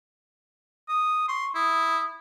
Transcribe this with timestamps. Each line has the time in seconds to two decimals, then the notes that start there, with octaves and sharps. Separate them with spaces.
0.89 D#6
1.28 C6 C#6
1.55 E4 D#6